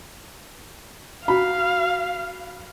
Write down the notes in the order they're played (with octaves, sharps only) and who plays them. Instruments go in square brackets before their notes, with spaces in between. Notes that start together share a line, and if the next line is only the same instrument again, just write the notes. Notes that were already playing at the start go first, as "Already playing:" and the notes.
[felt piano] F#4 B5 [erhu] F5